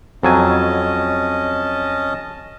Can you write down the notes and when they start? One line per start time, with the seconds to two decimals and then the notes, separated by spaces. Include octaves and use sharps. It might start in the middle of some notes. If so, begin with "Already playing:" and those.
0.23 F2 F#3 C#4 D#5 G#5 A5